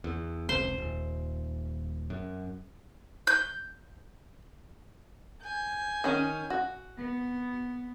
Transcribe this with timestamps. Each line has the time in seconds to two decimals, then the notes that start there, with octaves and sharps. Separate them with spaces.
0.04 E2
0.49 F1 C#2 C5
0.78 D#1
2.10 F#2
3.27 G6
5.44 G#5 G6
6.04 D#3 C#4
6.50 F#4
6.96 B3